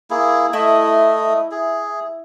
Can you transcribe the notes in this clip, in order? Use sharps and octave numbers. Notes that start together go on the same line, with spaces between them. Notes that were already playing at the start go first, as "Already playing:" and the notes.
A#3 E4 G#4
A3 E4 D#5
G#4